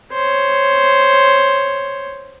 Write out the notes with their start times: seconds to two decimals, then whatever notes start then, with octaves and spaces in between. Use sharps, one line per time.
0.13 C5 C#5